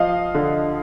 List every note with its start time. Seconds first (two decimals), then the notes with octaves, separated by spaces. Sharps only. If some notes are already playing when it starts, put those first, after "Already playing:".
Already playing: F3 D#5 F5
0.35 D3